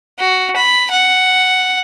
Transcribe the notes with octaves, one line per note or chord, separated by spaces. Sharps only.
F#4
B5
F#5